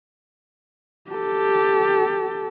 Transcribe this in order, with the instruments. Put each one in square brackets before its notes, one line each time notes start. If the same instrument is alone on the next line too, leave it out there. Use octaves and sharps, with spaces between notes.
[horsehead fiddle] G4 A4